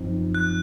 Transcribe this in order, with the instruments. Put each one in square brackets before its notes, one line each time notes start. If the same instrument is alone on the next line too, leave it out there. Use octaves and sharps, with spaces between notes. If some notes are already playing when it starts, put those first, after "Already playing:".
Already playing: [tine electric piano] F#2 F3 C4 D#4
[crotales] F#6